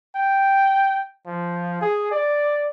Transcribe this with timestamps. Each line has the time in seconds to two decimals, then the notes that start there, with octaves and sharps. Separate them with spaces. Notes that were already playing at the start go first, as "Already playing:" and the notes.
0.15 G5
1.26 F3
1.81 G#4
2.11 D5